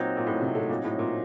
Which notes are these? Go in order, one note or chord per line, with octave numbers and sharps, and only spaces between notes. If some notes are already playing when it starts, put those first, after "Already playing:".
Already playing: A#2 F#3 C4 D#4
A#2
A2
A#2
C3
A3
A#2
A2
A#2